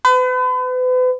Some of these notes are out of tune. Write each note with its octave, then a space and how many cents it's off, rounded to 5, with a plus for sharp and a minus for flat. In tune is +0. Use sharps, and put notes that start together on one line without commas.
B4 +40